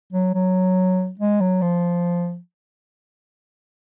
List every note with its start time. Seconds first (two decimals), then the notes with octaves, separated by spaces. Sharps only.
0.12 F#3
0.34 F#3
1.19 G#3
1.40 F#3
1.62 F3